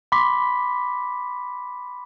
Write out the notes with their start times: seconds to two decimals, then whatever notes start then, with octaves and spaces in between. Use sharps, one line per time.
0.12 B5 C6 D6 B6